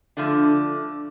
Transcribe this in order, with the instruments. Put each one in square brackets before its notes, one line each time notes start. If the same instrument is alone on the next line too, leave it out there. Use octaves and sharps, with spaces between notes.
[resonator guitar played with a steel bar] D3 F3 A3 D4